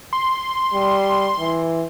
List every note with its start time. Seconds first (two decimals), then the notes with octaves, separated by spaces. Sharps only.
0.13 C6
0.74 G3
1.39 E3